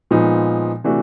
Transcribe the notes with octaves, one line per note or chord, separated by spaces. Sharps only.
A#2 F3 G#3 B3 D#4
C3 E3 A3 D4 F#4